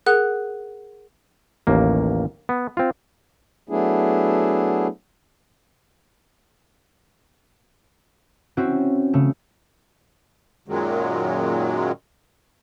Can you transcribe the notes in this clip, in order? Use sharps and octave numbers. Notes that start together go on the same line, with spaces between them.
G#4 A#4 F#5 F#6
A1 D#2 A#3
B3
C4 F4
F#3 A3 B3 D4 E4 G#4
C4 C#4 E4 F#4 C5
C#3 A3
F#2 A#2 D#3 F#3 G#3